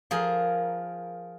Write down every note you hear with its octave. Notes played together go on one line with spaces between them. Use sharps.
F3 G#4 A#4